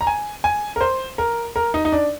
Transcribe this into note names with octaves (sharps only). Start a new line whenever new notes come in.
A#5
G#5
G#5
A#4
C5
A#4
A#4
D#4
D#4
D4